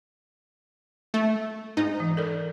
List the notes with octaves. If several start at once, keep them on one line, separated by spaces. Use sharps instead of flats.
A3
G#2 D#4
E3
A4 A#4 D5